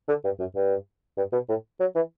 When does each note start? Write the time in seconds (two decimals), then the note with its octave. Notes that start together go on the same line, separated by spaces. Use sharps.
0.08 D3
0.24 G2
0.39 F#2
0.55 G2
1.17 G2
1.33 B2
1.49 A2
1.80 F#3
1.95 E3